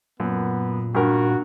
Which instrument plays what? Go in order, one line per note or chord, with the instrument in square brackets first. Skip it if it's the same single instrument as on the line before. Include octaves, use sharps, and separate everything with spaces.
[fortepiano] F#2 [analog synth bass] A#2 [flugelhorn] B3
[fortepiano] G2 A#4 [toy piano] C#4 D4 [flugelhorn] F#4